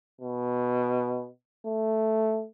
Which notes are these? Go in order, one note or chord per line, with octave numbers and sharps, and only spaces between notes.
B2
A3